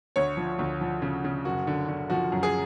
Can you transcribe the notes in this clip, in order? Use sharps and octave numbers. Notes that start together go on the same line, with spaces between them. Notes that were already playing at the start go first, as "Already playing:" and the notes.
D2 C#5
F3
D2
F3
C#3
C#3
F#1 F#4
D3
D3
F3 F#4
F#2
G#4